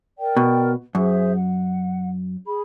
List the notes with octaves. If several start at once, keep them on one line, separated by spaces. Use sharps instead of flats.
A#4 D5 G5
B2
F#2 G#4 C5 E5
F#5
G#4 B5